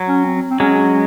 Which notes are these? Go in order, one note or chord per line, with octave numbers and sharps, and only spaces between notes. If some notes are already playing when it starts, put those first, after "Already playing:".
Already playing: F#3
C#4
C4
C4
F#3 G#3 C#4
C#4